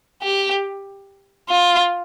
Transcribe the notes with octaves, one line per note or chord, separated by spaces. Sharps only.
G4
F4